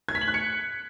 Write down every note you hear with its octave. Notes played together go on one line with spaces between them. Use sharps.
G#6
B6
F#7
F#6
C#7